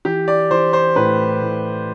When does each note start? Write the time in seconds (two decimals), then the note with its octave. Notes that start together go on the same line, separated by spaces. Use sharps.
0.05 E3 G4
0.28 D5
0.51 E3 C5
0.73 C5
0.96 A2 B4
1.41 A2